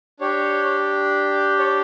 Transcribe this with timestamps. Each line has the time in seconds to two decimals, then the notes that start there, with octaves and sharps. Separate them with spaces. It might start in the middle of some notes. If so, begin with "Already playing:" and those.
0.20 D4 G4 C#5
1.59 C#5